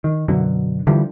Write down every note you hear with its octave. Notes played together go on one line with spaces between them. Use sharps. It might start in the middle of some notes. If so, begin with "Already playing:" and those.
D#3
F#2 B2 D3 F#3
D3 E3 F3 G3